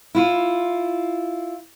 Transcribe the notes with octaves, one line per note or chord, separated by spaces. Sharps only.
E4 F4